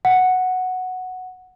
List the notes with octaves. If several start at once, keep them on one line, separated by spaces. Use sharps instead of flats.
F#5